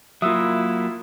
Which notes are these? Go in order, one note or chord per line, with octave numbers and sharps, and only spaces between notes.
F#3 A#3 E4 F4 E5 D#6 E6